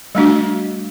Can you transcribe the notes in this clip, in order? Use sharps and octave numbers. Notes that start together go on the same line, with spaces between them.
G3 A3 D4 F#4